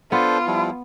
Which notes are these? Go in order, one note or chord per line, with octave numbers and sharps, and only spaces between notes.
B3 D4 F4 A4 C5
F3 G3 E4